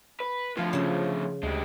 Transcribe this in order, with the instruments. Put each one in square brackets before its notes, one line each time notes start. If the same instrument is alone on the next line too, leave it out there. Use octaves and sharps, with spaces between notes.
[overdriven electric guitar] B4
[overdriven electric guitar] A2 D3 [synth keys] F3 F4
[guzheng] C#3 A5
[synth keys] D2 [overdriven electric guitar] G#3 G4